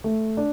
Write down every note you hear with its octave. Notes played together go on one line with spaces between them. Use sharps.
A3
D4